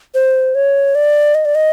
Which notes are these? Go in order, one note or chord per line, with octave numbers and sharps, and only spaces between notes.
C5
C#5
D5
D#5
D5
D#5